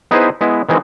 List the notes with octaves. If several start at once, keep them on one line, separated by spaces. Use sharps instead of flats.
B3 D#4 E4 G#4 B4 C5
G#3 B3 E4
D#3 E3 G#3 C4